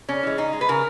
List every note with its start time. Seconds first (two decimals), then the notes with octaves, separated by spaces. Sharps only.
0.08 C#3 C#4
0.23 E3 G#3
0.38 C#3 D#4
0.53 G#3
0.61 B4
0.68 C#3 A#4